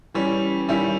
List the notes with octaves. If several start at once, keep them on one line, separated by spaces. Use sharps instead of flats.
E3 G3 C#4
D#3 G3 C#4 E4